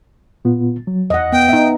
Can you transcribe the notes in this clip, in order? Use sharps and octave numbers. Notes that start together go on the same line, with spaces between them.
A#2 B3 F4
F#3
E2 D#5 F#5
B3 G5
B3 D#4 E5